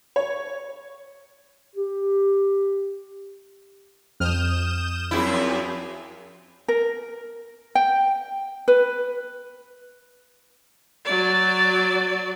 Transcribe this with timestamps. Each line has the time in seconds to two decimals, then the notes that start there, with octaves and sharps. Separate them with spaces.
0.16 C#5
1.76 G4
4.20 F2 D#6 F6 G6 E7
5.11 F#2 F3 C4 E4 G#4
6.68 A#4
7.75 G5
8.68 B4
11.05 F#3 D5